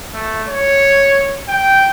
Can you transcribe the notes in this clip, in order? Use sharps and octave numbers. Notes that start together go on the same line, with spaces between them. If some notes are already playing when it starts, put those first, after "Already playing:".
A3
C#5
G5